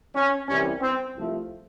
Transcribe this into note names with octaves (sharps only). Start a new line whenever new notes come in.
C#4
C2 C3 E3 G3 C#4
C4
C2 C3 F3 A3